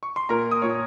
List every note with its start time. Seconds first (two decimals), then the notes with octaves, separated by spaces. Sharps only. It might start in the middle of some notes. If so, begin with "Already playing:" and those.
0.03 C#6
0.16 C6
0.29 A#2 A#4 A#5
0.51 D#6
0.62 A#2 C#5 C#6